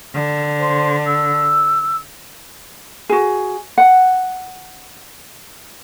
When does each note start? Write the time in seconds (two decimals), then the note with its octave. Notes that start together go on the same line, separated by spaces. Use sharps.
0.14 D3
0.59 C5
1.05 E6
3.09 F#4 G#4
3.78 F#5